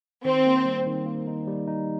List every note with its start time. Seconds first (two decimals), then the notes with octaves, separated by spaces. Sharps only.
0.24 D#3 C4
0.46 A#3
0.66 G3
0.87 D#3
1.06 A#3
1.27 D#4
1.47 G3
1.68 D#4